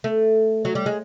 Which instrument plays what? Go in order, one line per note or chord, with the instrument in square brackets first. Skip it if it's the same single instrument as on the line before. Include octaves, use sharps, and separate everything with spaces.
[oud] A3
F#3
G3
G#3